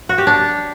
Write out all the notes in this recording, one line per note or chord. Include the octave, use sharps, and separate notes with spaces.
F#4
G4
D4